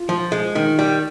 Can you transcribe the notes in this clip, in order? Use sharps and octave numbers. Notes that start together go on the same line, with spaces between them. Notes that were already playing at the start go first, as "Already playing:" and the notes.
Already playing: F4
F3
G#3
D#3
G3